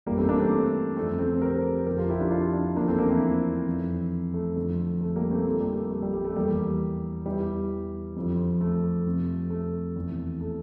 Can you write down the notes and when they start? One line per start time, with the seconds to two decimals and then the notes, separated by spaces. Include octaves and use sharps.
0.06 G2 E3 G3 A#3
0.18 A3 C4
0.29 A#3 D4
0.40 A3 C4
0.51 A3
0.96 F2 D3 F3 A3 C4
1.19 A3 C4
1.34 C5
1.41 G4 A#4
1.86 F2 D3 F3 G4 A#4
1.98 F4 A4
2.09 E4 G4
2.20 D4 F4
2.31 D4 F4
2.53 D4 F4
2.76 E2 D3 F3 A#3 D4
2.88 A3 C4
2.98 A#3 D4
3.10 C4 E4
3.66 F2 E3
4.34 A3
4.56 F2 D3 F3
5.01 A3
5.16 G3 A#3
5.31 A3 C4
5.46 F2 D3 F3 A3
5.61 G3 A#3
5.76 A3
5.91 A3
6.02 G3
6.13 G3
6.24 A3
6.36 E2 E3 G3 A#3
7.26 E2 E3 G3
8.16 F2 D3 F3
8.61 A3
9.06 F2 C3 F3
9.50 A3
9.96 E2 C3 E3
10.41 A3